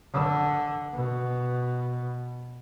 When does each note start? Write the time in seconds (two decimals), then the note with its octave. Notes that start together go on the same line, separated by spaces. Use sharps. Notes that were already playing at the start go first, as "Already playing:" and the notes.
0.13 D3
0.94 B2